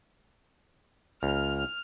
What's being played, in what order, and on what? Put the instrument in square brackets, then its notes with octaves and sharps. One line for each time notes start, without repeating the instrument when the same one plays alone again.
[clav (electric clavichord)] C#2 [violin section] F6